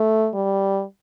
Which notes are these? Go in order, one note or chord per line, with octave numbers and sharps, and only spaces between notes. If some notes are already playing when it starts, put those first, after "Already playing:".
Already playing: A3
G3